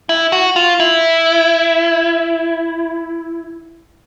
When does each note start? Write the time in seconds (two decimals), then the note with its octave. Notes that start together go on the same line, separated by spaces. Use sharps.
0.09 E4
0.32 F#4
0.56 F4
0.80 E4